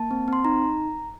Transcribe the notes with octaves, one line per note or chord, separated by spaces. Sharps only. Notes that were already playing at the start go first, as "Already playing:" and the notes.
Already playing: A#3 A5
C4
C4 C6
D#4 A#5